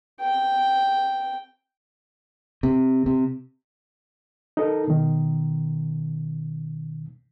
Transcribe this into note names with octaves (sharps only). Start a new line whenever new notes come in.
G5
C3
C3
D#4 A4 A#4
B2 D#3